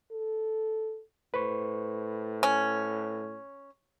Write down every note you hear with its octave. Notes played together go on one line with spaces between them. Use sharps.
A4
A2 B4 C5 C#6
C#4